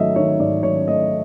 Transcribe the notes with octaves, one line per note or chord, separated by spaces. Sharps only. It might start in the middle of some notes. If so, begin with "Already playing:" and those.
Already playing: G#2 D#3 F#3 A3 D#5 E5
D#3 C#5
G#2 D5
F#3 C#5
A3 D#5